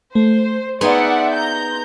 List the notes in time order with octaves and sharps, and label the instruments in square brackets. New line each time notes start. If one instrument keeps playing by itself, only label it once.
[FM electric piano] A3 [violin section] C5
[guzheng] B3 D#4 G#4 [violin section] D5 E5 F#5 [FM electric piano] C6
[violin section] A#5 G6